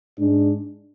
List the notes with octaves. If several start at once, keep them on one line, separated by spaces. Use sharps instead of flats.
G#2 G#3 D4